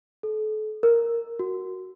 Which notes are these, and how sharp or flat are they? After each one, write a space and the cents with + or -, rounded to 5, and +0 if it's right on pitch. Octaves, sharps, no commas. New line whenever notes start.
A4 -35
A#4 -5
F#4 +5